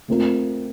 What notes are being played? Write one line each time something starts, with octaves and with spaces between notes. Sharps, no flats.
A3 C4 F4 A#4